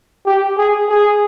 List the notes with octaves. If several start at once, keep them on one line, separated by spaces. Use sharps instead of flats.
G4
G#4
G#4